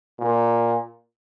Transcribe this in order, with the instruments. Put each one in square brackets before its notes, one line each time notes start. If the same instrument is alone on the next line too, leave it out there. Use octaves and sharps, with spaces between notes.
[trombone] A#2